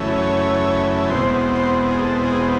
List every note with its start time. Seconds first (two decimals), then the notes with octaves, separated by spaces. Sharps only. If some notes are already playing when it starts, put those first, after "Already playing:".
Already playing: F#2 C#3 E3 A3 C#4
0.18 C#5
1.09 E2 B2 G#3 C4 C5
1.55 C5
1.89 G#4
2.01 A4
2.24 G#4